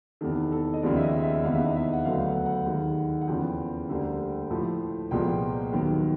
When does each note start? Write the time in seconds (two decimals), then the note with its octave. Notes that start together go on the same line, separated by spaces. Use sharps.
0.21 E2 C3 D#3 A4
0.52 A4
0.74 D#5
0.82 D#2 C#3 F3 G#3 B3 D5
0.97 E5
1.03 D#5
1.23 E5
1.44 E2 C3 D#3 G#3 B3 F5
1.55 E5
1.66 D#5
1.76 E5
1.93 F#5
2.05 D2 D3 F#3 B3 F5
2.21 F5
2.25 F#5
2.46 F#5
2.66 D#2 D#3 G#3
3.21 F#5
3.28 E2 C#3 F3 G5
3.89 D2 D3 G3 A#3
4.50 A2 F3 A3
5.11 C2 A#2 F3 G#3 B3 G5
5.73 D#2 D#3 F#3 B3